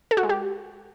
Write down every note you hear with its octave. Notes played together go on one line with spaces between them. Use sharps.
A4
F#4
G#3
G4